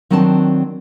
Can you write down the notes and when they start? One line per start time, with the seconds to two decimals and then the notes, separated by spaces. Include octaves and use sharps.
0.10 D#3 F#3 C4 D4 A5